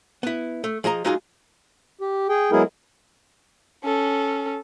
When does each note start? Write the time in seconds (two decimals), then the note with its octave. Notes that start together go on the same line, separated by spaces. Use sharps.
0.23 B3 E4
0.64 A3
0.84 F3 G#4 D#5 A#5
1.05 F#3 G#3 D#4 F4 G#4
2.01 G4
2.29 G#4 G5
2.52 F#3 G#3 B3 E4 G#4 A#4
3.84 C#4 A4